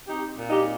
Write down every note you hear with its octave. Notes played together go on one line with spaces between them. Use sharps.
C4 D#4 G4
A#2
D#4 G4